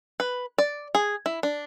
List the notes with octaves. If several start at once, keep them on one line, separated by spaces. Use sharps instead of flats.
B4
D5
G#4
E4
D4